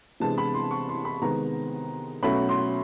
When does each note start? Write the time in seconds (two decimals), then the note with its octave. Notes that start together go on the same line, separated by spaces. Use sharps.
0.20 C3 E3 G#3 B3 D4 A5
0.38 B5
0.54 C6
0.71 C#6
0.89 C6
1.05 B5
1.22 C3 D#3 G#3 B3 A#5
2.23 B2 F#3 A3 C#4 B5
2.49 C6